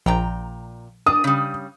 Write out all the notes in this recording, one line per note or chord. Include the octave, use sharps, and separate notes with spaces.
A#1 A#2 G5 A#5
D4 D#6
C#3 G3